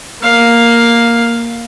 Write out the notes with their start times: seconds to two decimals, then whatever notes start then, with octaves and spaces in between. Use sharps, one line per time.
0.23 A#3 F5